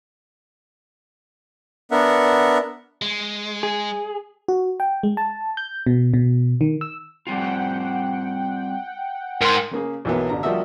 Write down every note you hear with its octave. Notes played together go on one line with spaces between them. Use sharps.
B3 D4 A#4 E5 F#5
G#3
G#4
F#4
G5
G#3
A5
G6
B2
B2
D#3
E6
G3 C4 F4 F#5 G5
G#2 A#4 C6
C#3 A#3 G#4
B1 E3 F#3 A#3 B3
A1 D3 A#5
F3 G3 A#3 F#4 D#5 E5